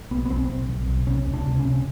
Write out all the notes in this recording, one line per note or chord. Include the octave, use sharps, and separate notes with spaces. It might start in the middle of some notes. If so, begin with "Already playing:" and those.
B1 B3
B3
B1 C4
B1
B1
B1
C3 C#4
C#2
D4
C3
C#4
C3